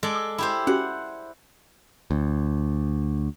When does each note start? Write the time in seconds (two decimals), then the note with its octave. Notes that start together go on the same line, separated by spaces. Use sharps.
0.03 G#3 A4 D5
0.16 D6
0.38 E4 G4 C5
0.67 C#4 F#4 G4 F#5
2.11 D2